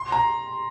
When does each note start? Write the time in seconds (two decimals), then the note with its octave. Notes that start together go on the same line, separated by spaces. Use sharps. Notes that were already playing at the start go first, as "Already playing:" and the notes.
Already playing: C6
0.12 A#5